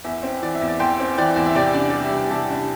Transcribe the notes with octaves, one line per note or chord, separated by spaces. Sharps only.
E2 E5
C4
E3 D5
E5
E2
D5
E2 G5 C6
C4
E3 D5 G5
E2
E5
C3 D5 G5
D4
G3 D5
E5
C3
G5
C3 E5 A5
D4
A5